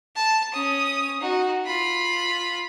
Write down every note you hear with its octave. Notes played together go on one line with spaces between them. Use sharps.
A5
C#4 D#6
D#4 F#4
F4 B5